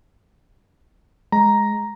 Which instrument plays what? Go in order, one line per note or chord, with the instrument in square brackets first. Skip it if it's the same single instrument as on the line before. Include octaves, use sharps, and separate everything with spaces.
[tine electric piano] G#3 [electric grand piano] A#5